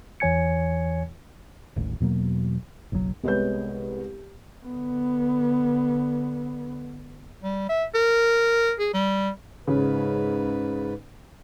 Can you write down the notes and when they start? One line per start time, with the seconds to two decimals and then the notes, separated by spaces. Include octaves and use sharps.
0.20 E2 E3 C#5 G#5 G#6 C#7
1.76 D#1 A1
2.00 E2 B2 F#3 A#3
2.92 F#1 B1 A#2 F#3
3.23 C2 G#3 B3 B4 C#5 G6
4.65 D3 B3
7.43 G3
7.69 E5
7.95 A#4
8.79 G#4
8.94 G3
9.67 G#2 C#3 B4